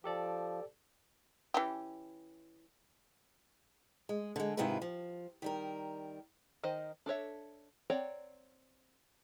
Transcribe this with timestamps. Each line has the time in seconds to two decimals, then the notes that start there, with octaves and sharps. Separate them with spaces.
0.04 F3 G4 A4 D5
1.54 E3 C#4 G4
4.09 G#3
4.36 D3 G#3
4.57 G#2 C3 D#3 E4 F4 B4
4.82 F3
5.42 D#3 G3 A#4
6.63 D#3 D#4 C5 D#5
7.06 D4 A4 C#5 E5
7.90 C4 C#5 D5 F#5 A#5